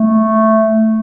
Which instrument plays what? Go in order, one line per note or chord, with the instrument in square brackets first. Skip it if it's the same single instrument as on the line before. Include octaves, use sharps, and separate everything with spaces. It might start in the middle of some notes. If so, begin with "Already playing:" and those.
Already playing: [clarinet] A3